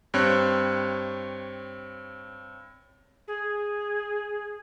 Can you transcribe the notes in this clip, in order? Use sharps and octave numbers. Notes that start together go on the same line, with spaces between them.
G2 C4 C#5 F#6
G#4